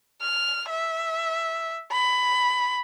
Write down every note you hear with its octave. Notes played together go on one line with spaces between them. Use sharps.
F6
E5
B5